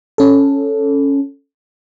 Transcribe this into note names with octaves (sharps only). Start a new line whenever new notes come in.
C#4 A4